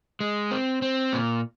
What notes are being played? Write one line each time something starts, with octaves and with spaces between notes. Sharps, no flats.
G#3
C4
C4
A#2